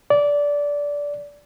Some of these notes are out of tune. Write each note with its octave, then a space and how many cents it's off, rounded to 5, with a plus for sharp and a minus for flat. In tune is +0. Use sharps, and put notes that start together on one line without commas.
D5 -15